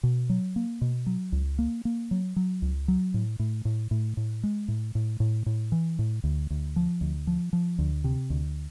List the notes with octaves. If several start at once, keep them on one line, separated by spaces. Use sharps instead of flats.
B2
F#3
A#3
B2
F#3
C#2
A#3
A#3
F#3
F#3
C#2
F#3
A2
A2
A2
A2
A2
G#3
A2
A2
A2
A2
E3
A2
D2
D2
F3
D2
F3
F3
D2
C3
D2